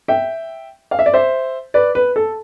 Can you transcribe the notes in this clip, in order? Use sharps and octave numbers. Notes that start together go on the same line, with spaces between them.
E5 G5
F5
E5
D5
C5 E5
B4 D5
B4
A4